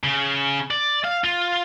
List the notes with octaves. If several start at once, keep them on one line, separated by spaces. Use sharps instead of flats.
C#3
D5
F5
F4